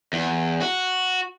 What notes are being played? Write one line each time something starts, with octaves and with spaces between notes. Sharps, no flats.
E2
F#4